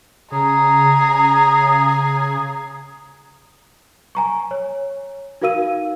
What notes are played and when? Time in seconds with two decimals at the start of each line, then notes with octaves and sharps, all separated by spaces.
0.32 C#3 G#4 A#5
4.15 G#5 A#5 C#6
4.51 C#5
5.42 D#4 F#4 A#4 F5 E6 D#7